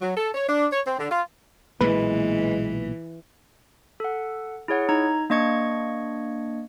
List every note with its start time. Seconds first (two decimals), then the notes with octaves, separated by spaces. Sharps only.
0.02 F#3
0.17 A4
0.34 C#5
0.49 D4
0.72 C#5
0.85 C4
0.99 D3
1.11 F4
1.81 B1 A#2 E3 G#3 A#3 B4
4.00 A4 F#5
4.68 E4 G#4 C#5 F#5
4.89 D#4 A#5 G#6
5.30 A#3 D4 D#5 C#6 G#6 C#7